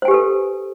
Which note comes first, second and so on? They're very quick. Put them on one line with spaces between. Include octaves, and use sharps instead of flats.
C5 G#5 G4 B4 A4